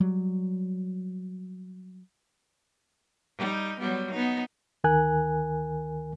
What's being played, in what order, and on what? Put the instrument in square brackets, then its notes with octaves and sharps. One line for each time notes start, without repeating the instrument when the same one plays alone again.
[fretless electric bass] F#3 G3
[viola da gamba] G3 D#4
F#3 G3 B3
B3 D#4
[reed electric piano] D2 D#3 A#4 G#5 F#6